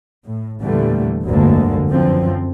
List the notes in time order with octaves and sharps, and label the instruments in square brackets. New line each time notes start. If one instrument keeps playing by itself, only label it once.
[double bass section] A2
E2 A#2 D3 E3 G3 A3
F1 D2 G2 D3 G#3 A#3
F#2 D3 E3 F3 C4